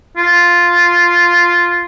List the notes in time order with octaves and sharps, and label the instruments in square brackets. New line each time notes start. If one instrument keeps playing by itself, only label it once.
[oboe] F4